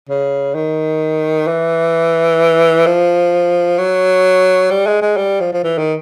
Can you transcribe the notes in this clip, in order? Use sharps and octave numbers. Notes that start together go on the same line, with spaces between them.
C#3
D#3
E3
F3
F#3
G3
G#3
G#3
G3
F3
F3
E3
D#3